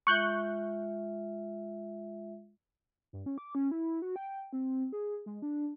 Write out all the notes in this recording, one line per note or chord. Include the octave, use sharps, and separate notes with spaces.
G#3 F4 E5 C#6 F#6 G6
G2
C#4
D6
C#4
E4
F#4
G5
C4
G#4
G#3
D4